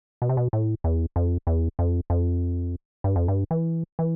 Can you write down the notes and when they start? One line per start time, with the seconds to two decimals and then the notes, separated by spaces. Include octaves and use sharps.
0.22 B2
0.29 C3
0.37 B2
0.53 A2
0.84 E2
1.16 F2
1.47 E2
1.79 F2
2.10 F2
3.04 G2
3.16 F2
3.28 G2
3.51 E3
3.99 E3